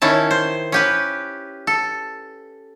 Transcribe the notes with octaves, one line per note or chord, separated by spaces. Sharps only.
D#3 C#4 E4 A5
C5
C#4 G4 B4
A4